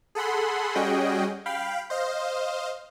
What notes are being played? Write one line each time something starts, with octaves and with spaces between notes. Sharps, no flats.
G#4 A4 F#5 B5 C6
G3 C#4 F#4 G#4 D#5 G5
F5 G5 B5
C5 D#5 F5